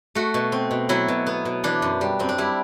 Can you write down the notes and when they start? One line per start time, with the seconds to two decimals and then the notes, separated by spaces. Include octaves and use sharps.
0.15 A3 F#4
0.34 B2
0.52 C4
0.71 B2
0.89 F#3 E4
1.08 B2
1.26 B3
1.45 B2
1.64 E3 D4
1.82 F#2
2.01 G3
2.19 F#2 C4
2.29 D4
2.38 G3 E4